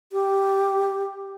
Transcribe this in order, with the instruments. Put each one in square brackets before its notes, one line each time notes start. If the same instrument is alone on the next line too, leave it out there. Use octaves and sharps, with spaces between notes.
[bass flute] G4